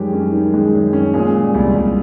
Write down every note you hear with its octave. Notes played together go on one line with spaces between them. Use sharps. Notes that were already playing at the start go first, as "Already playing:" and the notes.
Already playing: F#2 D#3 G3 G#3 G4
C#4
D#3
G#3
F#2
C#4
A#2 G#3 G#4
G3
C2
C2